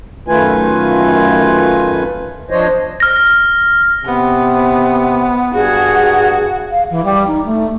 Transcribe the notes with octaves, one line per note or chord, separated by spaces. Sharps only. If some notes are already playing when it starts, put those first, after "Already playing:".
F#2 D#3 A3 F4 B4 G#5
F3 D4 C5 C#5 D#5
F6 A#6
C3 B3
G2 F#4 G#4
F5
E3
G3
D#4
A3